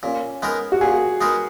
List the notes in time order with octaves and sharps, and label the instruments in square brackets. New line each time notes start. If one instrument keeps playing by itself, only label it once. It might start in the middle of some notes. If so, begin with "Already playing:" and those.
[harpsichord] A#2 [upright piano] C#4
[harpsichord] G#3 B3 D#4 A#4
[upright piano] F#4
[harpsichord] A#2 [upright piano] G#4
[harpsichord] G#3 B3 D#4 A#4